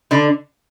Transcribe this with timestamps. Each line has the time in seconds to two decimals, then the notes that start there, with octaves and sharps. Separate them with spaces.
0.11 D3 D4